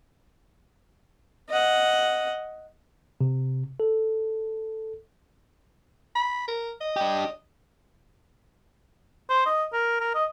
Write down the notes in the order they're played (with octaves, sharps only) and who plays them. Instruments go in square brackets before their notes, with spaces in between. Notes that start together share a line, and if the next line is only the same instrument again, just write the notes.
[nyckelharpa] D#5 F#5
[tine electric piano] C3
A4
[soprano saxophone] B5
A#4
D#5
[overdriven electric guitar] D4 G4
[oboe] C5
D#5
A#4
A#4
D#5